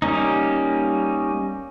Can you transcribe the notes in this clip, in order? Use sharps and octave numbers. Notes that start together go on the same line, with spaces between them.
G3 A#3 C#4 D#4